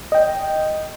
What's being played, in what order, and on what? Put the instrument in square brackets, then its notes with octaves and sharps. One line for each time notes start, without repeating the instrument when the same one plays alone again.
[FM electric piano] D#5 G5